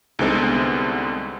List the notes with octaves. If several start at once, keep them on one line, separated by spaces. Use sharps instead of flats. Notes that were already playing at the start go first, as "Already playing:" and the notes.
C2 D3 G#3 B3 C4 D#4